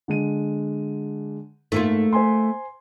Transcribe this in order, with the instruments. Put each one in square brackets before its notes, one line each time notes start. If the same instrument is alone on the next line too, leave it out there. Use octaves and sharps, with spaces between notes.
[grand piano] D3 G#3 D#7
[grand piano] G#2 [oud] A3 A#3 F4
[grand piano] C5 G#5 C6